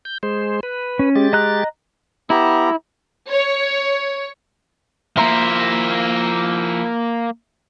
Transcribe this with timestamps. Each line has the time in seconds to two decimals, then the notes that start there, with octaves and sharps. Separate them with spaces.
0.05 G6
0.23 G#3 C5
0.63 B4
0.99 C#4
1.15 G#3 G4 A6
1.33 D#5 A#5 F#6
2.30 B3 E4 G4 A#5
3.30 C#5
5.17 F3 A#3 E4 A#4 E5 A#5 C6